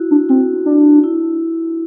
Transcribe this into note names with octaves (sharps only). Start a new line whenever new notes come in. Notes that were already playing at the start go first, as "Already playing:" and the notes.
Already playing: E4 F#4
D4
C4 F#4
D4
E4